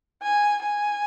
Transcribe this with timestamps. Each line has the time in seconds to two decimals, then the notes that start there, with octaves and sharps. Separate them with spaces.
0.23 G#5
0.63 G#5